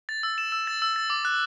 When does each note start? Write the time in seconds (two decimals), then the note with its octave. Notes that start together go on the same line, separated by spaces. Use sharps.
0.09 A6
0.23 E6
0.38 E7
0.52 E6
0.67 A6
0.82 E6
0.96 A6
1.10 D6
1.25 F#6